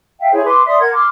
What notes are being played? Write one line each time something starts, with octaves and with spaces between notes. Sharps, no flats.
E5 F5 G5
E4 G#4 C5 C#5
B4 C6 D6
D5 E5 C6 D#6
A#4 F#5 G#6
C6 D6 F6